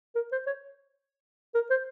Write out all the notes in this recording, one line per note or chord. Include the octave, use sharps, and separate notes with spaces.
A#4
C5
C#5
A#4
C5